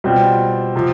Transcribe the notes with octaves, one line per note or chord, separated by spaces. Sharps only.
B2 G3 C4 F4
C3 F3